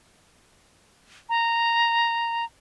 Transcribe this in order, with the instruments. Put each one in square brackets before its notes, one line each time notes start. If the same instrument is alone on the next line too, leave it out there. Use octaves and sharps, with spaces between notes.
[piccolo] A#5